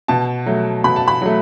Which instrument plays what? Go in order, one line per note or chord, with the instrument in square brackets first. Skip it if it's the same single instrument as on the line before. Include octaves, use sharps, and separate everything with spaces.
[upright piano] B2 A5
F#3 A3
B2 B5
A5
B5
F#3 A3